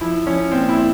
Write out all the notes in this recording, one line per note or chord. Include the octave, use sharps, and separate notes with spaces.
F3 E4
F3 C#4
A#2 C4
E4
A#2